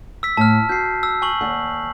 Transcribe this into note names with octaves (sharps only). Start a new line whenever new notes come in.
E6 B6
A2 A5 F6
F#4 G6 C7
E6
G#5 C#6 F#7
D#2 D5 F#5